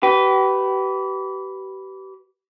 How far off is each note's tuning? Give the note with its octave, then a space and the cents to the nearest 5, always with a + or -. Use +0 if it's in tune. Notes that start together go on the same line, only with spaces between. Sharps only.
G4 -35 B4 +0